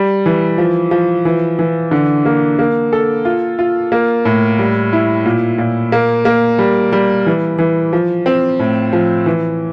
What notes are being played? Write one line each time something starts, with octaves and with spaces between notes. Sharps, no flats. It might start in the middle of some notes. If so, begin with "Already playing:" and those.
Already playing: G3
E3
F3
F3
E3
E3
D3
A#3
A#3
A4
F4
F4
A#3
A2
G3
E4
A#2
A#2
A#3
A#3
G3
G3
E3
E3
F3
C4
A2
F3
E3